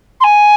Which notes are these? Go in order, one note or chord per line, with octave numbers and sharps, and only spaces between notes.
C6
G#5